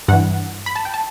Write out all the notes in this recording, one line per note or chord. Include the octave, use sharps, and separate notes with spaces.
G2 E3 F#5
B5
A5
G5
A5